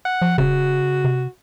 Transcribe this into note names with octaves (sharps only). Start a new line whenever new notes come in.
F#5
F3
D#1 C#3 F#4
C3